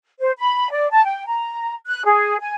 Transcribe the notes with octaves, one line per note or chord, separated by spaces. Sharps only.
C5
B5
D5
A5
G5
A#5
F#6
G#4
G#5